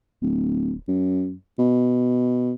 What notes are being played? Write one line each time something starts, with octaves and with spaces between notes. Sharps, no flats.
D1
F#2
B2